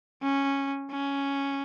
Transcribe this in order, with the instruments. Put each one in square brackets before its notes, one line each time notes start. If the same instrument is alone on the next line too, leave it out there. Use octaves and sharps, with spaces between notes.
[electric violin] C#4
C#4